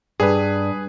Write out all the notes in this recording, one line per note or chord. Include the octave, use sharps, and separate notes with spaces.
G2 G#4 B4